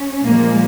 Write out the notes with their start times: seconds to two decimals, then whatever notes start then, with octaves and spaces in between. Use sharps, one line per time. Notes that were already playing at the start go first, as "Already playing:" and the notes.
Already playing: C#4
0.23 A#2 F3 G#3 A#3